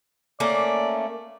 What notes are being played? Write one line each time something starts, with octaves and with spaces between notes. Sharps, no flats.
A3 A#3 C#4 D5